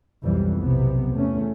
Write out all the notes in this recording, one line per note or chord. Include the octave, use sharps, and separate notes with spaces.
B1 F2 G#2 E3 G3
B1 C3 B3
E2 A3 C#4